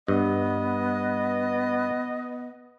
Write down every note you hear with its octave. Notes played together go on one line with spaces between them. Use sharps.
G2 B3 D#5